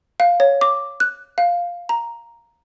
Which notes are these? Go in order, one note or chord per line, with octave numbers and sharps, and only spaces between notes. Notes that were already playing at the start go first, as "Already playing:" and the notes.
F5
C#5
D6
F#6
F5
A#5